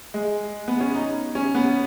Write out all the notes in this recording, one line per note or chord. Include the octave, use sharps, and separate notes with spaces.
G#3
B3
C#4
D#4
C#4
B3